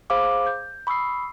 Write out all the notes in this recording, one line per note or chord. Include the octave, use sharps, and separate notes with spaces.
G#4 C5 F5 B5 D6
G6
B5 C#6 D#6 E6 C7